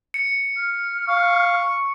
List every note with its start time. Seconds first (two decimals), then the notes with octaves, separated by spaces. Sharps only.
0.14 C#7
0.56 F6
1.09 F5 C#6